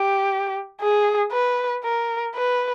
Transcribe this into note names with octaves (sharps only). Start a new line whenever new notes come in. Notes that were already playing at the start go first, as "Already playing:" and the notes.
Already playing: G4
G#4
B4
A#4
B4